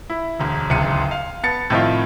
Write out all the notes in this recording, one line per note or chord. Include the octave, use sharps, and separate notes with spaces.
E4
E1 D2
D1 G#1 C#2 C#7 D#7
F5
B3 A5 A6 C#7
A2 C3 D#3 F3 E4 F4